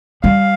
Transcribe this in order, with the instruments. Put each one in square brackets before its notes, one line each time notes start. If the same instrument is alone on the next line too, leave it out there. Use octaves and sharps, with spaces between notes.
[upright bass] G3 [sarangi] F5